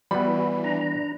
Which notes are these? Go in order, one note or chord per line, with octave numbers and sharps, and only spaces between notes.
E3 G3 B3 F#4 B5
D4 A#5